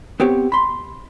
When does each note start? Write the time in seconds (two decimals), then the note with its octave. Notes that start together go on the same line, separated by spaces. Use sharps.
0.20 B3 C4 G4 C#5
0.52 B5 C6